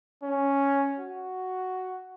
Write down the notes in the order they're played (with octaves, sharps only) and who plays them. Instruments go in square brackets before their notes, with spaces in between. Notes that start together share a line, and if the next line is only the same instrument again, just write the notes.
[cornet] C#4
F#4